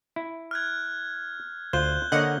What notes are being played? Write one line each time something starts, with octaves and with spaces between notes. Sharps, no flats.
E4
F6 F#6 G#6
D2 F4 C5 F#6 G6 G7
D3 A#3 C#5 D#5 F#5